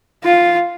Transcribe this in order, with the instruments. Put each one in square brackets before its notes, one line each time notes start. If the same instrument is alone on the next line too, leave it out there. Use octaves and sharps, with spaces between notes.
[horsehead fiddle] F4